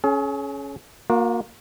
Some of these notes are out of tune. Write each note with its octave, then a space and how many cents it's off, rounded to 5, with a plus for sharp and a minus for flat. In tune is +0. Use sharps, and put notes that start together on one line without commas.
C#4 +0 G#4 +40
A#3 +0 F#4 -45